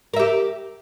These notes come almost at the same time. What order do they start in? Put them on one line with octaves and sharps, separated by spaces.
A#4 E5 G4